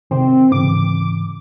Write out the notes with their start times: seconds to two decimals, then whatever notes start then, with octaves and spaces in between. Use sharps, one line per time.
0.11 C3 D#3 C4
0.52 G#2 C#3 E3 D6